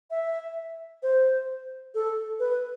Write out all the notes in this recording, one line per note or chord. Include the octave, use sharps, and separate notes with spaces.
E5
C5
A4
B4